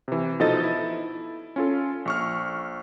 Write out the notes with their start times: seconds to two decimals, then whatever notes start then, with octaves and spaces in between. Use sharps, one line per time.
0.08 C3 E3
0.40 B2 F3 D#4 A4 D#5 A6
0.63 E4
1.56 C#4 F4 A4
2.05 A#1 C#6 F6